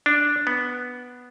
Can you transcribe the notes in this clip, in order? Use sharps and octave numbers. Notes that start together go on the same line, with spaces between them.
D4
B3